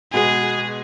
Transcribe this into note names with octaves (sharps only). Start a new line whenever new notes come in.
B2 G#3 B3 G#4